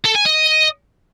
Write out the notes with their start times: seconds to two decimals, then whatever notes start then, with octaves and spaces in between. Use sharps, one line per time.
0.05 A4
0.15 G#5
0.25 D#5